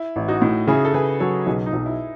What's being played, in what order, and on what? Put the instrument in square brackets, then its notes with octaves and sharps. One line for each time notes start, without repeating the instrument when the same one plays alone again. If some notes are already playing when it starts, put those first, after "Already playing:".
Already playing: [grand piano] E4
[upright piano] A1
[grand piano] D#4 F#4
[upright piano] A2
[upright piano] C#3 [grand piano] E4 G#4
[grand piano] A4
[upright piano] C#3 [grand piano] G#4 B4
[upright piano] F#3 [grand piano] A4 C#5
[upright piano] B1 [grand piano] G#4 B4
[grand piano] D#4
[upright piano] B1
[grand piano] E4